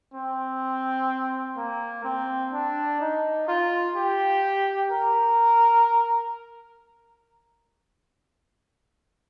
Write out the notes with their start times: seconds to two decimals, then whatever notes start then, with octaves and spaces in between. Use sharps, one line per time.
0.14 C4
1.57 A#3
2.04 C4
2.53 D4
3.00 D#4
3.48 F4
3.96 G4
4.91 A#4